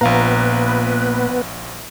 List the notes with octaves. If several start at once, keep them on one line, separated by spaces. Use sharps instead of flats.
A#1 A#2 B3 B4 F5 A#5